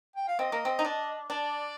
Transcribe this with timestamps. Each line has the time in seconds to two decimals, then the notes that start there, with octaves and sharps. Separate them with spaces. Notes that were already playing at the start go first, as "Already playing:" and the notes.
0.16 G5
0.28 F5
0.39 C4 D#5
0.52 A#3
0.65 C4
0.79 D#4
0.85 D4
1.30 D4 D5